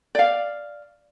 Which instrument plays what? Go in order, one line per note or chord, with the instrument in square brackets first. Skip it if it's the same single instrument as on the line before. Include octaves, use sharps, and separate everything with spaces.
[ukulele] D5 F5